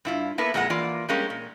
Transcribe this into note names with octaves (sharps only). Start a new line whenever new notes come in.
G2 E4 F4
A#3 B3 E4 A4 B4
F2 A#2 G#3 E4 F#5
E3 A#3 F4 D5
G3 G#3 A#3 C#4
A#2